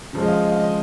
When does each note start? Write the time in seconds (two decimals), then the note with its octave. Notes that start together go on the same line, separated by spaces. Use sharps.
0.13 C#3 F3 G#3
0.23 D#5
0.28 F5
0.44 D#5
0.51 F5
0.60 D#5